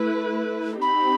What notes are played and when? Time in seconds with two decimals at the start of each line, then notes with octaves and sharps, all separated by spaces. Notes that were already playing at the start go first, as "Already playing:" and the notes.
Already playing: A3 E4 B4
0.81 C4 D#4 G4 B5